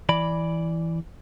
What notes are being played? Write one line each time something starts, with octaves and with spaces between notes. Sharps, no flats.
E3 D5 B5